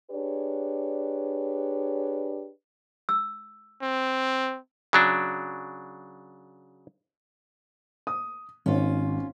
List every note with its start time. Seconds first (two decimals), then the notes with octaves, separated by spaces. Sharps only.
0.11 D4 G4 G#4 B4 C#5 D5
3.09 E6
3.82 C4
4.93 C#3 F#3 D4
8.07 D#6
8.66 G#1 C#4 F4